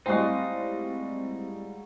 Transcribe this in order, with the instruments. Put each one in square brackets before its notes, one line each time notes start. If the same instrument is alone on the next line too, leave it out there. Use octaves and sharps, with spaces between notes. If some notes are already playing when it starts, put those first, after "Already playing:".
[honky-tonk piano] A2 G3 [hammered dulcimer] G#3 F#4 [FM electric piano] C4 [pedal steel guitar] D#4 F5 D#6